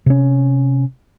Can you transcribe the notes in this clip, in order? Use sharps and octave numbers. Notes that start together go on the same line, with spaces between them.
C3 C#4